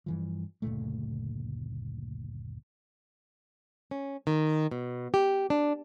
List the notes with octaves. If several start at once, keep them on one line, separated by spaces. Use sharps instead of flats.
G2 E3 F3
F#1 D2 A#2 A3
C#4
D#3
B2
G4
D4